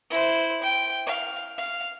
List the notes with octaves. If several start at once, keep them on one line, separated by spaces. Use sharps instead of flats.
E4 C5
G5
F5
F5